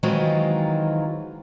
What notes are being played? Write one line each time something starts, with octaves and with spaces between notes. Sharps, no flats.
D#3 E3 F#3 G#3 C4 F4